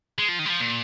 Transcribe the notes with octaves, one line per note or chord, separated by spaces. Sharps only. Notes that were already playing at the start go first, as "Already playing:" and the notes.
G#3
F3
D#3
G3
F3
A#2